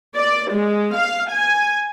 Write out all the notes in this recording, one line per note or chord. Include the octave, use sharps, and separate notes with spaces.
D5
G#3
F5
G#5